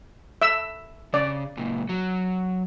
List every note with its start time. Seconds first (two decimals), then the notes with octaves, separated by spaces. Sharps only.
0.42 E5 E6
1.14 C#3 D5
1.57 C#2 A#2
1.89 F#3